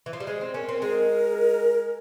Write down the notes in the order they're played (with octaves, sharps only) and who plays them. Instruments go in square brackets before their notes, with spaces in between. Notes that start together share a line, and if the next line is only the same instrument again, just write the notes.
[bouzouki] E3
F3
G3
[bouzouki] G#3 [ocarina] C5
[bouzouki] C4
[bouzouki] C#4 [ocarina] A#4
[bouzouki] C4
[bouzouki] G#3 [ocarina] A#4